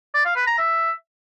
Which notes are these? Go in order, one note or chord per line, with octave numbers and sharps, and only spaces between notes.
D5
F5
B4
A#5
E5